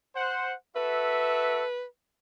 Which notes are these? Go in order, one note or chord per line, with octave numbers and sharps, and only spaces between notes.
C5 F#5
F#4 A4 B4 E5